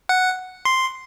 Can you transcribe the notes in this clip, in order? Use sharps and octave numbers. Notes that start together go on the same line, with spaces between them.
F#5
C6